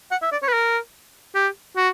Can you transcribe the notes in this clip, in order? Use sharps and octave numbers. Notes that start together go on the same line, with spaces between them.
F#5
E5
D5
C#5
B4
A#4
G4
F#4